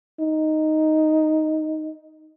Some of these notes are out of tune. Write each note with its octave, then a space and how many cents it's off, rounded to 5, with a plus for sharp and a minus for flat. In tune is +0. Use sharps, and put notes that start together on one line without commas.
D#4 +0